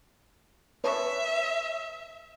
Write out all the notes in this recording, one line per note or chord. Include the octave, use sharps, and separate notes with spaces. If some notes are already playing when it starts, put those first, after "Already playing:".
B4 C#5 E5 A5